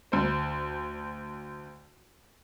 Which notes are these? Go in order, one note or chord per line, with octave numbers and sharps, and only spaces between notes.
D2 C5